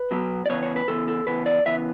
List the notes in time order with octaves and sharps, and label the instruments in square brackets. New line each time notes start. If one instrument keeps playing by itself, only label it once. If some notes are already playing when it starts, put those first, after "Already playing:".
Already playing: [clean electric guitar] B4
B2 F#3 B3
D5
C#3 E3 B3 C#5
C#5
B4
C#3 E3 B3 A4
A4
C#3 E3 B3 B4
D5
C#3 E3 B3 E5